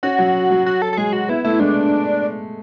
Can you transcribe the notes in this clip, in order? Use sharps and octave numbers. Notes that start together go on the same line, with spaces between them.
C#4 F#4
F#3
F#3
F#4
A4
A4
G#3 G#4
F#4
B3 E4
A3 E4
G#3 D4